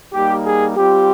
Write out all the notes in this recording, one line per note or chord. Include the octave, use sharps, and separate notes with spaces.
G3 A#3 D#4 G4
G#4
G3 C4 F4 G4